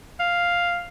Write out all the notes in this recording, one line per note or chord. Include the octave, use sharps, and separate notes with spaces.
F5